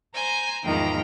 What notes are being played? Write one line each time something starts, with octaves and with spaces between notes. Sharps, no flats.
C5 G#5 A#5 G6
E2 G#2 D#3 F3 G5 A#5